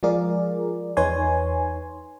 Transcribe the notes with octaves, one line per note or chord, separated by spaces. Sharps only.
F3 G#3 F4 G#4 A#4 D5
E2 D#4 B4 C#5 G#5 C6